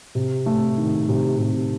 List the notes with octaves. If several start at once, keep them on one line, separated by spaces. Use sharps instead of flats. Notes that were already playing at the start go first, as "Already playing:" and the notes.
C3
A3
D#3
C3
C3